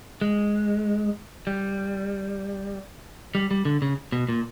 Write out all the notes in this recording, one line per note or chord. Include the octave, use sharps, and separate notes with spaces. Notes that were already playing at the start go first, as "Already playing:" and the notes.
G#3
G3
G3
G3
D3
C#3
B2
A#2